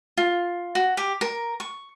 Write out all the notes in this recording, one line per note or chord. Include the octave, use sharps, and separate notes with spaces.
F4
F#4
G4
A#4
C#6